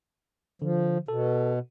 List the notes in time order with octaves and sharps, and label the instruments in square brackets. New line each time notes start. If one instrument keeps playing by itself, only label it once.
[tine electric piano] D3 [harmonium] F3
[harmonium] B2 [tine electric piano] A4